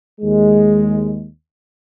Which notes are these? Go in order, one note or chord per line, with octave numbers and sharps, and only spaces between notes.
D#2 G#3